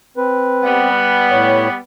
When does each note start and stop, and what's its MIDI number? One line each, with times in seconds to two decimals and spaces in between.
0.17 0.90 60
0.17 0.90 71
0.63 1.74 55
0.63 1.74 59
1.31 1.68 45
1.31 1.68 73